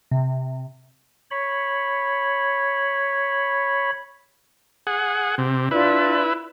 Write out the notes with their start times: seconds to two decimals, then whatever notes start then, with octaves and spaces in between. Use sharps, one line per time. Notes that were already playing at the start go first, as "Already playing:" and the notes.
0.11 C3
1.31 C#5 B5
4.87 G#4 F#5
5.38 C3
5.71 D4 E4 F4 B4 D5